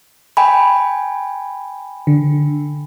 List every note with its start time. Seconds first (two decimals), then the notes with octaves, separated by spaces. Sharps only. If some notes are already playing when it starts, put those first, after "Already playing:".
0.37 G5 G#5 B5
2.07 D3